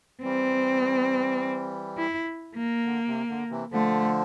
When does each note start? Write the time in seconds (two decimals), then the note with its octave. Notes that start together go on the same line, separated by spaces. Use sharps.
0.23 E3 G3 C4
1.98 E4
2.56 A#3
2.85 D3
3.08 C3
3.29 D3
3.50 C3 E3
3.72 D3 F3 A3